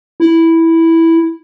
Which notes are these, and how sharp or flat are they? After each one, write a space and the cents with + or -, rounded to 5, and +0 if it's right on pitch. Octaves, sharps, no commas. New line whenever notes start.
E4 -5